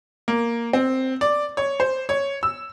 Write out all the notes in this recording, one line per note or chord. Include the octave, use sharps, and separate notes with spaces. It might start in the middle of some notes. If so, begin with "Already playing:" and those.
A#3
C4
D5
C#5
C5
C#5
E6